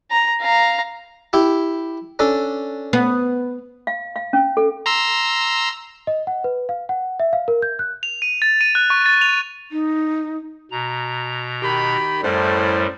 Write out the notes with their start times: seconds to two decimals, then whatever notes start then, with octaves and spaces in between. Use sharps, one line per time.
0.11 A#5
0.41 F5 A#5
1.33 E4 G4
2.19 C#4 D4 A4
2.93 B3
3.87 F5
4.16 F5
4.33 C#4
4.57 A4
4.86 A#5 C6 E6
6.07 D#5
6.27 F#5
6.44 B4
6.69 F5
6.89 F#5
7.20 E5
7.33 F5
7.48 A#4
7.62 G6
7.79 F#6
8.03 F7
8.22 D#7
8.42 A6
8.61 D#7
8.75 F#6
8.90 C#6
9.06 A6
9.21 F7
9.72 D#4
10.71 B2 A#5
11.63 D#3 G4 B5
12.22 F#2 A2 G3 C5